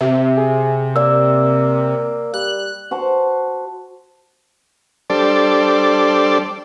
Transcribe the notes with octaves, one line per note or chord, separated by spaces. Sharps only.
C3 E5
G#4
A#3 D5 E6
G3 F#6
F#4 C5 A5
G3 D4 A4 C5 D5